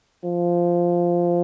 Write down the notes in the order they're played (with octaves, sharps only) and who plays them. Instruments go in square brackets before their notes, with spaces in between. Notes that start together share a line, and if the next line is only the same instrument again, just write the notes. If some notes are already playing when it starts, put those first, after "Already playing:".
[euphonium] F3